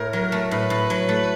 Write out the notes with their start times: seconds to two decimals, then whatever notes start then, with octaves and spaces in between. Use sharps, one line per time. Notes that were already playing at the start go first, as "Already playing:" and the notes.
Already playing: A2 A3 A#4
0.13 F#3
0.32 A3
0.51 A2 B4
0.70 A2
0.90 F#3
1.09 A3